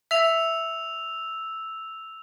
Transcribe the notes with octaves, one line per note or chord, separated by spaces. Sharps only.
E5 E6 F7